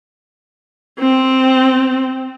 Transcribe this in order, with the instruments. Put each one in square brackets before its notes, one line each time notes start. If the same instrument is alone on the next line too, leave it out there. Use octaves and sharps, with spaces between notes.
[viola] C4